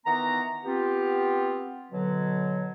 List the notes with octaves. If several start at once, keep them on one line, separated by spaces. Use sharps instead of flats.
D#3 E3 B3 F#5 A#5
B3 C4 F4 G4
B2 D3 F#3